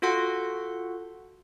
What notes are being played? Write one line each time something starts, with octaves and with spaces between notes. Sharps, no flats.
F4 F#4 A4 F#5 C6